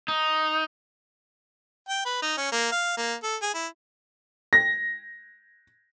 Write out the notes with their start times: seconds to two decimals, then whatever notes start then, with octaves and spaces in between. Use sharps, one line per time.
0.08 D#4
1.89 G5
2.06 B4
2.22 D#4
2.37 C#4
2.52 A#3
2.72 F5
2.97 A#3
3.23 A4
3.42 G#4
3.54 E4
4.53 A#6